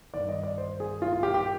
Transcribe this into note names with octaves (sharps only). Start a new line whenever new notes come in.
G2 D#3 D5
D#5
D5
C5
G#4
F4
F4
G4
G4